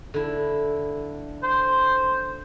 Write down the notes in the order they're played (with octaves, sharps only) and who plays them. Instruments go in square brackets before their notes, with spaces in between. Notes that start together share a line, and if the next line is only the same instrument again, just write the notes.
[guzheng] D3 E4
[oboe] C5